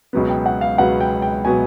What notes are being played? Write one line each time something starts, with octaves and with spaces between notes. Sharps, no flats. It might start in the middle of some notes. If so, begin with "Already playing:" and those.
C#2 B2 F#3 B3
G5
F#5
F5
C#2 B2 F#3 B3 F#5
G5
G5
B2 F#3 B3 G#5